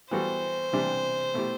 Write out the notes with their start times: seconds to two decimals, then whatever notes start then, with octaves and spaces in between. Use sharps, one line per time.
0.11 E3 G3 B3 F#4 A4 C5
0.73 C3 E3 G3 D4 G4
1.34 B2 A3 E4 G4